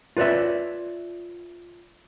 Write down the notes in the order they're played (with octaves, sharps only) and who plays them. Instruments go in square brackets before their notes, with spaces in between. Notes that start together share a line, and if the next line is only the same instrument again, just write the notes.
[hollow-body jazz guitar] F4 B4 C#5 D5 E5